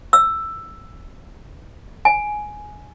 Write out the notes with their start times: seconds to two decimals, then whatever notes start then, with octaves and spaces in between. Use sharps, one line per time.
0.13 E6
2.05 G#5